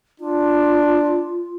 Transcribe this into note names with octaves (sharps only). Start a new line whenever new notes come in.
D4 F4